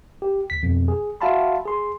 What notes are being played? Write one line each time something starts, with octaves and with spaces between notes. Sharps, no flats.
G4
D2 B6
F2 B2
G#4
F#4 E5 F5 A5 B5 C6
G#4 C6